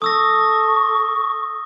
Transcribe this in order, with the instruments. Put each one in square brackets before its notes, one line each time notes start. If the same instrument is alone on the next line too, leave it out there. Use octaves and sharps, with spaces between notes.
[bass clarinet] A4 [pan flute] C#6 [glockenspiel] D#6 E6 A#6